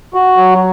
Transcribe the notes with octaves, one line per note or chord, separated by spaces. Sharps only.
F#4
F#3